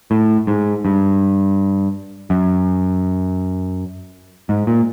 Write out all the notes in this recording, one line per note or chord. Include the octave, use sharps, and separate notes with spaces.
A2
G#2
G2
F#2
G#2
A#2